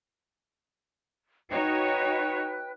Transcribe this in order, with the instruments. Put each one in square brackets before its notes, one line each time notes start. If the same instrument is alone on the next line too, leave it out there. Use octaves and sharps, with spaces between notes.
[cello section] D#4 F#4 C#5 [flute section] B4 G5 F#6